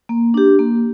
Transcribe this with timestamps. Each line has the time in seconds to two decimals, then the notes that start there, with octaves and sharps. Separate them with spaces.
0.09 A#3
0.34 D4 G4
0.59 A#3